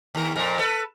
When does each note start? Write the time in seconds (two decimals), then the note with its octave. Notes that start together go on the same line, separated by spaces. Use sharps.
0.15 D#2 A#4
0.36 F2 A#2 A#4
0.59 A4 B4